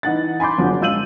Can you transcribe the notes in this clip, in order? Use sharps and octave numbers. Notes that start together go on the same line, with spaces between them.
E3 D#4 F#5 A6
G#5 B5 C6 D6 G6
F#1 D3 F3 F#3
G#3 F4 E6 G6 D#7 F#7